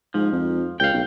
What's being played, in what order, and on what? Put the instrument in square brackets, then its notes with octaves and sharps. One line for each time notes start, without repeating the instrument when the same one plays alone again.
[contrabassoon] G#2 [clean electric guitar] F3
[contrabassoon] F2
[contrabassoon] C#2 [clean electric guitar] F5 G5
[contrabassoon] B1